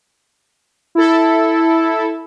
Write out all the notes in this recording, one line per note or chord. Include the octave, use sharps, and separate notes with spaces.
E4 A4